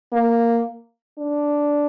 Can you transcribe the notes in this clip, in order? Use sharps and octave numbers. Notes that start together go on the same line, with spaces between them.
A#3
D4